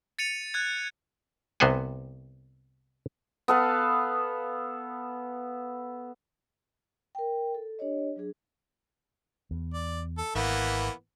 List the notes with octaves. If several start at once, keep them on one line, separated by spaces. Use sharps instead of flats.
A6 C#7 D#7 F7
F#6 G#6
C2 C3 B3 C5 F#5 G#5
B3 A4 F5
A#4 G5
A4
D4 G4 C#5 D#5
F#3 D4 G#4
E2
D5
A4
G#1 E3 A#3 B3